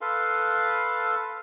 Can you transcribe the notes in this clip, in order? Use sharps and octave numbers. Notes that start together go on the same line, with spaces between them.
A4 B4 F5 C6